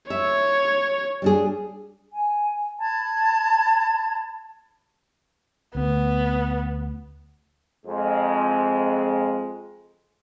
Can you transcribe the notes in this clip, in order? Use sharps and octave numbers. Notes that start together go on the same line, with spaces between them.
C#5 E5
G3 D4 G#4
G#5
A5 B5 G#6
D2 B3
F2 G#3